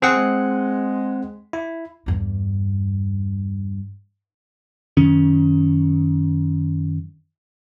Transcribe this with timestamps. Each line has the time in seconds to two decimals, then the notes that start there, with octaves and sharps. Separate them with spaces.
0.02 D#3 F3 B3 C4 G#4 F#5
0.15 G#3
1.53 E4
2.06 E2 G2
4.97 F#2 D#3 C#4